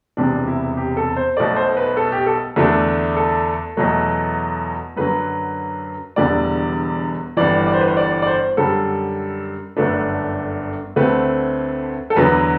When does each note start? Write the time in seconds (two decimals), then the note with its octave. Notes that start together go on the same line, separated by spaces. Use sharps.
0.17 E1 E2 C3 D4
0.48 E4
0.77 G4
0.97 A4
1.16 C5
1.37 B1 B2 A3 D5
1.56 C5
1.77 B4
1.97 A4
2.12 G4
2.26 A4
2.56 E2 D3 A3 D4
3.16 A4
3.77 E2 B2 F#3 A3
4.96 F#2 D3 F#3 B4
6.16 E1 E2 D3 G3 D5
7.37 G1 G2 E3 D5
7.67 D5
7.74 C5
7.81 B4
7.88 C5
7.97 D5
8.22 D5
8.27 C5
8.57 F#2 D3 G3 A4
9.77 G1 F#2 D3 A3 D4 B4
10.96 D2 D3 A3 C4 B4
12.10 A4
12.16 E2 D3 F#3 B4